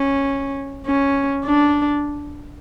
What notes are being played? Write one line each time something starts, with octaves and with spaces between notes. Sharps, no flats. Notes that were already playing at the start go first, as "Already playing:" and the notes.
Already playing: C#4
C#4
D4